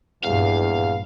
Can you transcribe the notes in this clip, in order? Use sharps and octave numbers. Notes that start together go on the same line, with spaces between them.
A#1 E2 G2 F5